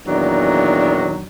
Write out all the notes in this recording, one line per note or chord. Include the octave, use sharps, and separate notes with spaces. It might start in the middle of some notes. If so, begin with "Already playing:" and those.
E2 A#2 D#3 F#3 D4